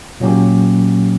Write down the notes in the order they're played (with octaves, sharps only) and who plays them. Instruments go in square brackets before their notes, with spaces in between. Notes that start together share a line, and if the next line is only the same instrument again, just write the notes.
[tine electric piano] A#2 F#3 A#3 C#4 G4